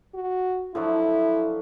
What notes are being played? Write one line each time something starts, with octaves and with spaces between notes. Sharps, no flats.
F#4
D3 F3 F#3 E4